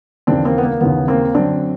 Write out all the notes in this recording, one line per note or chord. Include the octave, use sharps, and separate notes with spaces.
D#2 C#3 E3 C4 D4
A#3 C4
B3
A#3
D#2 C#3 E3 B3
A#3 C4
F#2 D3 C4 D4